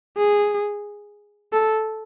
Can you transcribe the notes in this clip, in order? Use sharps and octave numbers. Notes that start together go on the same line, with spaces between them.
G#4
A4